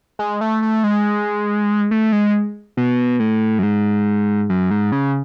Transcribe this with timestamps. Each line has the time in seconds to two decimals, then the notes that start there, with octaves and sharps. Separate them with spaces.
0.19 G#3
0.41 A3
0.62 A3
0.84 G#3
1.91 A3
2.12 G#3
2.77 B2
3.20 A2
3.59 F#2
3.63 G#2
4.49 F#2
4.71 G#2
4.92 C#3